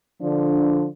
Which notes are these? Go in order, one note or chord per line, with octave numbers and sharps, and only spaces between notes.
D3 F3 D4